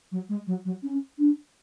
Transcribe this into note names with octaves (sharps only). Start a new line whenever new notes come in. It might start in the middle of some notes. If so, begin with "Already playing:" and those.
F#3
G#3
F#3
F#3
C#4
D4